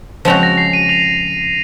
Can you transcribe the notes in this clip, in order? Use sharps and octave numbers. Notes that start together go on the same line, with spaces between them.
C#3 F3 G#3 C4 F#4 F7
A#6
C7
D#7
F7